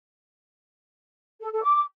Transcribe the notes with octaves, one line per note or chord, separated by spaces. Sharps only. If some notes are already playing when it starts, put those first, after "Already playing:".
A4
A4
D6